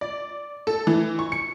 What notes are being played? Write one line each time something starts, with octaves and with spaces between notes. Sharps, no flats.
D5
A4
E3
C#6
C#7